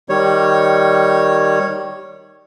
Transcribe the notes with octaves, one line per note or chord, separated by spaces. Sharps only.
D#3 G3 C#5